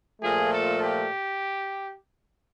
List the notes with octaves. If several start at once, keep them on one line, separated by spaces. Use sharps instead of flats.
A#2 F3 A3 G#4
A4
G4